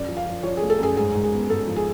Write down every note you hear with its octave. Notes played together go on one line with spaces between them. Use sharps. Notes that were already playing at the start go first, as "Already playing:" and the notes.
Already playing: F#2 D5
F3
F5
F3
F3 C#5
A3 G#4
A4
F#2 G#4
G#2 G#4
G#2
G#4
B3
G#2 A4
F3
G#4